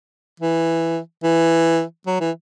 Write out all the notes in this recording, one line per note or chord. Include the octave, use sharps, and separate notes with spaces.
E3
E3
F#3
E3